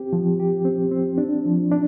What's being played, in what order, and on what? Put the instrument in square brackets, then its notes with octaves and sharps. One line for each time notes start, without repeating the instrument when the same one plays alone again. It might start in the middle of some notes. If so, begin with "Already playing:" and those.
Already playing: [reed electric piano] C4 G4
F3
G4
C4
C4
D4
F3
D4